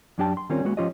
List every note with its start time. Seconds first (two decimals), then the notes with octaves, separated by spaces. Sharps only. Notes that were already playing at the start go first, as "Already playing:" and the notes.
0.18 F#2 F#3 D4 G4 G5 A5
0.37 C6
0.49 D#3 G3 C4 C#4 F4 A#4
0.65 G#3 A#3 B3 F#4
0.77 F3 C#4 F4 G4 C#5 D#5